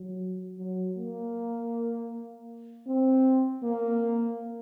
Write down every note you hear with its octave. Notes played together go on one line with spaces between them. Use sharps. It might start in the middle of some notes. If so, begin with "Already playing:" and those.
Already playing: F#3
F#3
A#3
C4
A#3